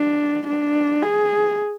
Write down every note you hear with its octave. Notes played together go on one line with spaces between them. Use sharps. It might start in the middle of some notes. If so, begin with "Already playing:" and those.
Already playing: D4
D4
G#4